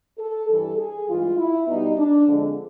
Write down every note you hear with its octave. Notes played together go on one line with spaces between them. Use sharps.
A4
G2 E3 G3 A4
G#4
G2 E3 G#3 F4
E4
B2 G3 D#4
D4
F2 D3 F3 G#3